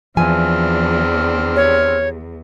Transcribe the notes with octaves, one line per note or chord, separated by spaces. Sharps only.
E2 E3 F3 C4 D4 G#5 F6
G4 C#5